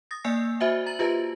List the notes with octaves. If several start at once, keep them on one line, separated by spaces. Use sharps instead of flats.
D#6 A6 A#6
A#3 D5 G#5 E6 C7
F#4 C5 D#5 E5 G#5
A#5 A6 F#7
F4 G4 B4 D#5 A5